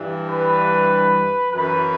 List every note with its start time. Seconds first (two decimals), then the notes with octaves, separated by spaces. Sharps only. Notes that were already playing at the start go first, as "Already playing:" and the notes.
Already playing: G2 E3
0.29 B4
1.51 F#2 E3 B4